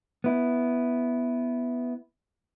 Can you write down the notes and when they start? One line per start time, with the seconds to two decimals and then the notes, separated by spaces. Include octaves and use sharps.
0.24 B3 E4